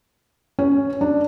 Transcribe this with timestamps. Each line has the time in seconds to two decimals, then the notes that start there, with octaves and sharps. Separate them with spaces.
0.59 C#4
1.01 D4